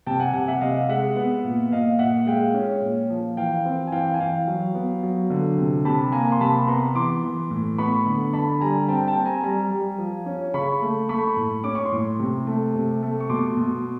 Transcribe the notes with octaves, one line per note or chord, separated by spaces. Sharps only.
C3 G5 A5
F#5 G#5
C3 F#5 G#5
E5 F#5
C3 D#5 F5
G#3 E5 F#5
B3
A#2
A#2 D#5 F5
A#2 E5 F#5
G#3 F5 G5
C#4
A#2
F3
E3 F5 G5
C4
G#5
E3 F5 G5
G#5
E3 F5 G5
F#3
B3
F#3
D3
C3
C3 A5 B5
A#3 G#5 A#5
C6
C3 A5 B5
B3 A#5 C6
E3 C6 D6
E3
A2
B3 B5 C#6
D3
D3 A5 B5
G3 G#5 A#5
C4 G5 A5
G5 A5
C4
G#5 A#5
G3 G#5 A#5
G3
F3
C#4
C#3 B5 C#6
A3
A3 B5 C#6
A2
C#4 D6
C#6
C6 D6
A2
C3
A3
C3
A3
C#6
B2 C6 D6
B2